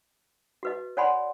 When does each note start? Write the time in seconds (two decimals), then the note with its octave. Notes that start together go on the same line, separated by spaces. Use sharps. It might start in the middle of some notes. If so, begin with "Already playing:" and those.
0.63 F#4 B4 D#5
0.97 C#5 D5 F#5 G#5 B5 C6